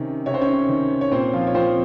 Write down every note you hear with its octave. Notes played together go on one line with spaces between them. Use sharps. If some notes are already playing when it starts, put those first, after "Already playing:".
Already playing: C3 D#3 C#4
C3 C#5
C5
C#4 C#5
D#3
C#5
A#2 C4 C5
F3 F4
C#5
F3 C4 C5